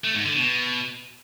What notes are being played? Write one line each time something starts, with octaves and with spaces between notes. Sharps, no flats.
A3
G#2
D3
B2